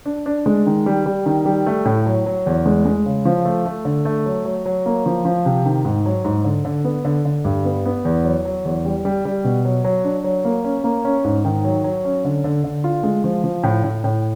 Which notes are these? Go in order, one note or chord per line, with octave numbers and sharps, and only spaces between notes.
D4
D4
G#3
D#3
G3
G3
D#3
G3
A3
A2
F#3
F#3
E2
G#3
G#3
C#3
F3
A3
A3
D3
A3
F#3
F#3
F#3
A#3
F3
F3
C3
D#3
G#2
F#3
G#2
D3
D3
B3
D3
D3
G2
B3
B3
E2
F#3
F#3
E2
G3
G3
G3
B2
F#3
F#3
D4
F#3
A#3
C#4
A#3
C#4
G#2
D#3
F#3
F#3
C#4
D3
D3
D3
F4
G#3
F3
F3
A2
A2
A2